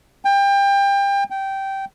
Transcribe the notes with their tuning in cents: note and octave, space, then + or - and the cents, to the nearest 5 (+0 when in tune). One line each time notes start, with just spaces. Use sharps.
G5 +25
G5 -15